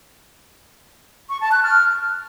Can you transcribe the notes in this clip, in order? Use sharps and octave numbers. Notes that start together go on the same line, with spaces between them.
C#6
A5
F#6
F6